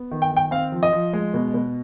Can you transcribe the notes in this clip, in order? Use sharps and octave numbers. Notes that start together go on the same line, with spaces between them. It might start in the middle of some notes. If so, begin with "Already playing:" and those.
Already playing: B3
D#3
G5
D#3
G5
C4 F5
F3
D#5
F3
G#3
B2
B2